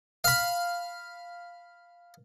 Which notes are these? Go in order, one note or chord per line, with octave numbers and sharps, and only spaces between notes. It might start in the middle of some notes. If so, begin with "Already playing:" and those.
F5 B5